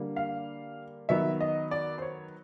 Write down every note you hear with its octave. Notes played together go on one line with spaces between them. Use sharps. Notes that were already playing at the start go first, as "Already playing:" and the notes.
Already playing: D3 G3 A#3
F5
D#3 F#3 B3 E5
D#5
D5
C5
C#5